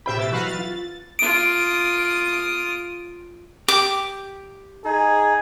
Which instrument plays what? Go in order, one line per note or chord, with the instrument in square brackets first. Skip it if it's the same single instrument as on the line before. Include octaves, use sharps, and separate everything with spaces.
[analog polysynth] A2 E5 G5 [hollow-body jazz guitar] G4 C5 B5
[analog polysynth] B2 E6 A6
[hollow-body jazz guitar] E3 F#3 [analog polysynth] F#4 B4 F5
[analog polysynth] A6
[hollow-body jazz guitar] F4
[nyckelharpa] F4 D#6 [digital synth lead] D7
[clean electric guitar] G4 G5 [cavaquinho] D6
[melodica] D#4 [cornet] G#4